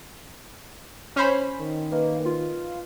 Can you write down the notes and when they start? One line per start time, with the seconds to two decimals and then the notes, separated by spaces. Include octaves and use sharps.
1.16 C#4 C5 B5
1.59 D#3
1.92 A#3 B4 D#5
2.25 F4